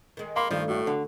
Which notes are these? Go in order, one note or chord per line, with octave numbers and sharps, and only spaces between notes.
D#3 G#3
A#3 F5 B5 C6
G2 D#3 F3 A3
A2 F#4
D3